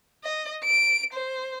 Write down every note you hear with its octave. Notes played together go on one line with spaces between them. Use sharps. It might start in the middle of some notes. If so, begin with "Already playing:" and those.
D#5
D7
C5